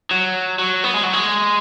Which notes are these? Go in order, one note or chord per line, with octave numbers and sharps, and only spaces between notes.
F#3
F#3
B3
G#3
F#3
G#3